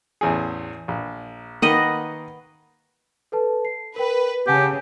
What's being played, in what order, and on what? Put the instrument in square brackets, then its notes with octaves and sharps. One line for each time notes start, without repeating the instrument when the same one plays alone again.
[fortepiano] A1 E2 G#4
A#1
[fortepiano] D#3 A#3 [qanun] B4 D#5 F#5
[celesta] A4 B4 A5
C7
[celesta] A#4 G5 [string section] B4
[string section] C#3 [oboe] G4 [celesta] F#5 G#5 A5